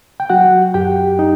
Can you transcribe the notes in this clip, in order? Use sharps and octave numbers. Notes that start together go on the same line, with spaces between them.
G5
F#3 F#4 F#5
F#2 G4 G5
D#4